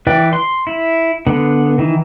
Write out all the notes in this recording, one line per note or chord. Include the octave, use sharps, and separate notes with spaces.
E3 B4 D5 G5
C6
E4
D3 B3
D#3 E3